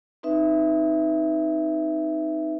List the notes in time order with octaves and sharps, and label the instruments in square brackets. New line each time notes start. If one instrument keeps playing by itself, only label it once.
[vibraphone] C4 D#4 B4 E5